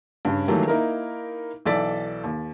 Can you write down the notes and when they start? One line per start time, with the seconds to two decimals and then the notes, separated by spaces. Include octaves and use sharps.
0.25 G2 C#3 C#4
0.48 D#3 E3 F#3 G3 A3 A#3
0.67 A#3 D#4 E4 A#4
1.66 B1 E3 A4 D5 A6 B6
2.24 D#2